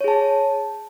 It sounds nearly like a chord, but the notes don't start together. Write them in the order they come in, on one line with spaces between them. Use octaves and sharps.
C#5 G#4 A5